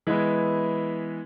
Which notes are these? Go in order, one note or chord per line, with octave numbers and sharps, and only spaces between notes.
E3 G#3 B3 E4